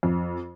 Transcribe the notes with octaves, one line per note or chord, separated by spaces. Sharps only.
F2